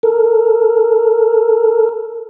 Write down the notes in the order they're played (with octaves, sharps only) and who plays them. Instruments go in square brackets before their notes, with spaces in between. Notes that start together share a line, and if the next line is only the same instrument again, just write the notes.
[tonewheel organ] A4 A#4